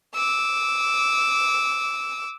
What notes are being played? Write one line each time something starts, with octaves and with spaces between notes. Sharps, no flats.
D6 E6